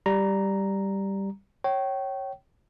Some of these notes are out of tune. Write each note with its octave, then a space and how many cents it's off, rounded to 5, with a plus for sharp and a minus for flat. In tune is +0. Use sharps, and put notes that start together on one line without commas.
G3 +0 A#5 +0
C#5 -15 G5 -30